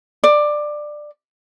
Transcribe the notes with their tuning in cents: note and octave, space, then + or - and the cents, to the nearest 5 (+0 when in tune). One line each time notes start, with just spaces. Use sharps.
D5 +15